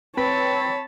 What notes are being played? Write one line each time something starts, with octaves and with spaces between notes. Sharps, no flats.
C4 B4 C#5 A5 B5